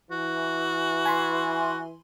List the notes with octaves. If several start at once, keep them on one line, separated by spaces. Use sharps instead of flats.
E3 F#4
G#5 B5 C6